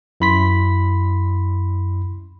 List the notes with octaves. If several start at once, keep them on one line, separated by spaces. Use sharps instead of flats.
F#2 E4 B5 C6 B6